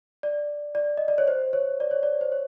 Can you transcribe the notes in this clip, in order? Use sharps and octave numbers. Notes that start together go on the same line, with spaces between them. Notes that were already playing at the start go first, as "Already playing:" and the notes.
D5
D5
D#5
D5
C#5
C5
C#5
D5
C#5
D5
C5
C#5